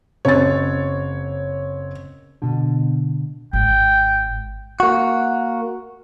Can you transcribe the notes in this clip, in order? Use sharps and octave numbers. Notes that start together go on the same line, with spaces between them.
F#1 C4 C#5 A6
B2 D3
G#1 G5
A#3 F#4